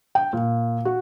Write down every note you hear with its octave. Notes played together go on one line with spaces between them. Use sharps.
G5
A#2
F#4